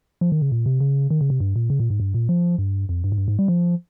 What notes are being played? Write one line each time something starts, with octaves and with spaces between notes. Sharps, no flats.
F3
D#3
C#3
A#2
C3
C#3
D#3
C#3
C3
G2
A#2
C#3
A#2
G#2
G2
A#2
F3
G2
F2
G2
G#2
G2
G#2
G3
F3